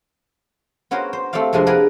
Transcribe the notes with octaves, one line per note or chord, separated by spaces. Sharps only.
B3 C#4 F#4 A#4 C5
C5
A3 C4 G4 D5 F5
F2 C3 F3 G#3 A#3 D4
G4 G#4 A#4 B4 D5 F#5